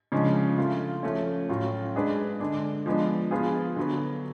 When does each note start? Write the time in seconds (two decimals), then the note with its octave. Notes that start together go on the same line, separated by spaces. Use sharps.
0.12 C#3 F3 G#3 D4 F4
0.58 F3 A3 F4
1.03 F3 A3 C#4
1.49 A2 F#3 C#4 F4
1.95 G#3 D4 G#4 B4 D5
2.40 D3 G#3 D4
2.86 F3 G#3 B3 D4
3.31 F3 B3 F4 G#4
3.76 D3 F#3 B3